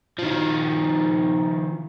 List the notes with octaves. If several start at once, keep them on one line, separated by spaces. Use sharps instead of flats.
D#3 F3